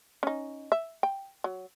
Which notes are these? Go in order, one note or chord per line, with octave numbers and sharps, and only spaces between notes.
C#4 D#4
E5
G5
F#3